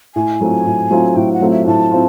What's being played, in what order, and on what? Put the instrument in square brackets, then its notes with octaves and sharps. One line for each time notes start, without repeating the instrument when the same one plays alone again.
[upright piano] A2 [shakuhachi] G#5
[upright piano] F#3 A3 C4 F4
A2
F#3 A3 C4 F4
[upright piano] A2 [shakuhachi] G5
[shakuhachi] F#5
[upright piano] F#3 A3 C4 F4
[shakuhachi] E5
[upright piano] A2 [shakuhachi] A5
[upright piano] C4 F4